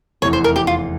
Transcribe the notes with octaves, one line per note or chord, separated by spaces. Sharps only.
F1 E2 E3 C#5
C5
A#4
G4
F4